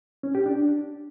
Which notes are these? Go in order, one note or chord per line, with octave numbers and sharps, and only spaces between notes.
C#4
G4
D4